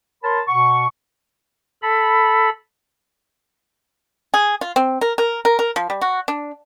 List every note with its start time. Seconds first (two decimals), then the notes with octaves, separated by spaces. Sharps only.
0.23 A#4 C#5 A5 B5 C6
0.47 B2 F#5 C#6
1.82 A4 B5
4.34 G#4
4.61 F4
4.76 C4
5.01 A#4
5.18 A#4
5.45 A#4
5.59 A#4
5.76 F3
5.90 G3
6.01 F#4
6.28 D4